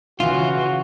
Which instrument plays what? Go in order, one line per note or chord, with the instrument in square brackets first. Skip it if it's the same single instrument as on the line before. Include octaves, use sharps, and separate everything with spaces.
[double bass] C#3 E3 [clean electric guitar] F4 [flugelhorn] F#4